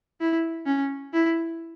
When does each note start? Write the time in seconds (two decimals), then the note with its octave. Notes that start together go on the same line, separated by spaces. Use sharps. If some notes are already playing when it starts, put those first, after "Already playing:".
0.21 E4
0.66 C#4
1.14 E4